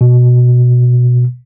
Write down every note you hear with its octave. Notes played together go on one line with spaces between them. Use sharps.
B2